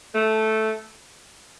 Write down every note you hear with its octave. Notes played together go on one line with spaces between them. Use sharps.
A3